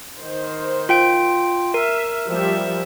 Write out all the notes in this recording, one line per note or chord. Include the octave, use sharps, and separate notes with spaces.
D#3 C5
F4 G5 D7
A#4 E5
F3 G3 E5